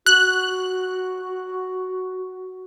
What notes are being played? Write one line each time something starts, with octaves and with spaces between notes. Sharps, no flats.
F#4 F#6